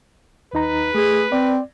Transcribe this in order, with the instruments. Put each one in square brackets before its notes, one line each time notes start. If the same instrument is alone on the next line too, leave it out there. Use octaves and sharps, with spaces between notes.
[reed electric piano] D#2 D#4 A#5 [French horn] B4
[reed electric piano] A3 [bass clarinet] G#4
[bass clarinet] C4 [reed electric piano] D5